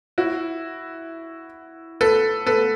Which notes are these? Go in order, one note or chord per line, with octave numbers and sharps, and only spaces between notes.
E4 F#4
A4 B4
A4 B4